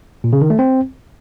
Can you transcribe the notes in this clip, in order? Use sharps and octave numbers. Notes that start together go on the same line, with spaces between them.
A#2
C#3
D#3
A3
C4